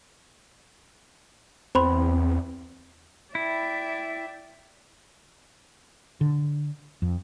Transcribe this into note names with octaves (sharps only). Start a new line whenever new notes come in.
E2 C4 C5 B5 C6
E4 D5 E5 G5
D3
F2